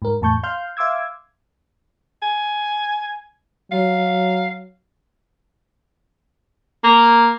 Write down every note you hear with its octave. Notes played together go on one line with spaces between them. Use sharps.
G#2 A#4
E2 A2 A5 C#6 G6
F5 C6 F6 G6
E5 F5 C6 D6 E6 G#6
G#5
F#3 F5
A#3